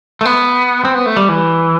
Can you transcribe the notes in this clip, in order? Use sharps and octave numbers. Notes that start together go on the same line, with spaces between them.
A3
B3
C4
B3
A3
G3
E3